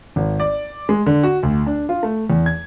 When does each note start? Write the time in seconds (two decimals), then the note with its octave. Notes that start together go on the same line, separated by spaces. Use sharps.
0.16 G#1
0.40 D5
0.89 G#3
1.06 D3
1.23 F#4
1.43 D2
1.66 D4
1.89 F4
2.03 A3
2.30 E2
2.46 G#6